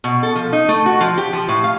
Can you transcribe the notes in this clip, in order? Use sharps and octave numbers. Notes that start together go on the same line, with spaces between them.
B2
A4
F3
D#4
A3
F#4
F3
G4
F3
A2
F5